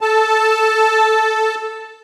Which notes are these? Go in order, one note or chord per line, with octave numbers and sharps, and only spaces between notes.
A4 A5